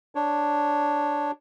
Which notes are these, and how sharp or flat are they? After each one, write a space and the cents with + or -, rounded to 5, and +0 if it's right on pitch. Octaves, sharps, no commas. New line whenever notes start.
D4 +0 C#5 +0